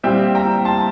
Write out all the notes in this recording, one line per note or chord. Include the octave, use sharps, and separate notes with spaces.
A#2 G3 C4 E5 G5
G5 A#5
A5 C6